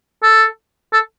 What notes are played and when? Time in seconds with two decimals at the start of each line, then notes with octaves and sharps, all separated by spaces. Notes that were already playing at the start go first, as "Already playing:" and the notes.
0.23 A4
0.93 A4